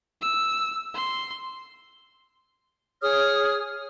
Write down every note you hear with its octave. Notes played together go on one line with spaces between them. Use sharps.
E6
C6
G#4 C#5 D#6 F6